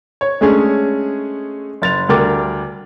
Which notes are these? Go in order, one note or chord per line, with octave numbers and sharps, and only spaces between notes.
C#5
G#3 A3 C#4 D4 G#4
F#1 A6 F7
D2 G3 A#4 G5 D6 A6